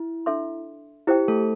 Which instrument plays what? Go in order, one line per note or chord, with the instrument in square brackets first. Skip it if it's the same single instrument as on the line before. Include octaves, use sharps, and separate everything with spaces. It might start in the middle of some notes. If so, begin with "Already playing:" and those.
Already playing: [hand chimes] E4
[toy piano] D4 A4 E5 C6
[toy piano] E4 C5 G5 [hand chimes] G4
[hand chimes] A3 A4